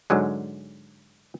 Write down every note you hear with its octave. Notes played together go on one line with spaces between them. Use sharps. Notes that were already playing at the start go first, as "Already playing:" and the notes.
G#2 D3 F#3 G#3